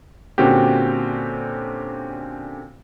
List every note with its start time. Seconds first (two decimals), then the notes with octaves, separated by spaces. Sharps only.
0.38 A#2 D3 C4 C#4 F#4 G4